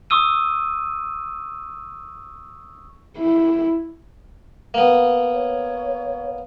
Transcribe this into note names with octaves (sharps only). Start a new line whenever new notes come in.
C#6 D#6 E6 D#7
E4
A#3 B3
C#5